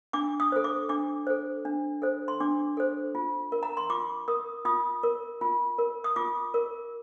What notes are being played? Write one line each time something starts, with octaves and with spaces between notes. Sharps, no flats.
D4 D6
D#6
A4 C5
D6
D4 D6
A4 C5
D4
A4 C5
C6
D4 D6
A4 C5
F4
A#4
A#5
C6
F4 D6
A#4 D#6
F4 D#6
A#4
F4
A#4
D#6
F4 D6
A#4